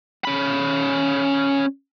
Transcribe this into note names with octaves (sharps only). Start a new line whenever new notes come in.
C#4 B5